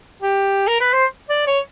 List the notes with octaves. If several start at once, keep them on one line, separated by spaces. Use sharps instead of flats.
G4
A#4
B4
C5
D5
C#5